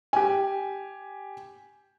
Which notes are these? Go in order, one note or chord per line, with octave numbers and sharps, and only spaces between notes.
G4 G#5